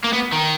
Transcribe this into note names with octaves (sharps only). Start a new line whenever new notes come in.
A#3
B3
D#3